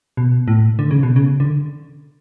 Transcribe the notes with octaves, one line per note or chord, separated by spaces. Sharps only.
B2
A2
D3
C#3
B2
C#3
D3